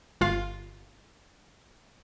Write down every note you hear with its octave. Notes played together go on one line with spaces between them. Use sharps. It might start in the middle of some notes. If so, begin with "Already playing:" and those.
G1 F4 F5